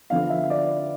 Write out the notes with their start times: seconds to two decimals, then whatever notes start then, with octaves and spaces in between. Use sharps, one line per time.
0.10 D3 F3 B3 D4 F5
0.30 E5
0.50 D5